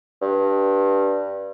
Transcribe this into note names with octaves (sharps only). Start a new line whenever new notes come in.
G2